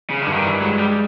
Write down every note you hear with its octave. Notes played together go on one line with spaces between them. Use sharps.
C#3
D3
G2
D#3
E3
F#3 G#3
G3